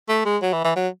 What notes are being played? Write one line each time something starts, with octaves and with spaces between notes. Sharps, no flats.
A3
G#3
F#3
E3
E3
F#3